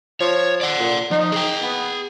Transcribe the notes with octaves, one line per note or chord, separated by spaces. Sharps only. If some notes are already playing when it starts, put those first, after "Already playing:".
F3 C#5
D5 F#5
A#2
F3 D#4
G#4 G5
B3